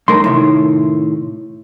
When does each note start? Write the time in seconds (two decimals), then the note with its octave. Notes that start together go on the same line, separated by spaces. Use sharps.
0.08 B1 A3 A#4 C6
0.24 A2 C3 D#3